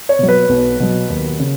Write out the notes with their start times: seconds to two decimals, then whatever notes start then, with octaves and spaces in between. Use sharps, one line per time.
0.09 C#5
0.19 B2 F#3
0.29 B4
0.49 B1
0.80 B2 F#3
1.10 D#2
1.39 C#3